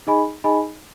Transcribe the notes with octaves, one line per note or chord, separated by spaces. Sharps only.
D#4 G#4 D#5 G#5 B5
D#4 G#4 D#5 G#5 B5